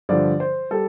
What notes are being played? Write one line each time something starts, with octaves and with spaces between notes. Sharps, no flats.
G2 D3 F3 D5
C5
G3 A4